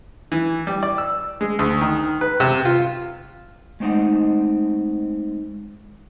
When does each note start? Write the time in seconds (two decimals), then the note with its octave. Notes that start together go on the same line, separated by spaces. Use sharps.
0.32 E3
0.67 G3
0.83 D5
0.98 E6
1.41 G#3
1.59 D2
1.81 D#3
2.21 B4
2.40 C3
2.65 F4
3.80 G#3 A3 C4 D#4 D#5 F#5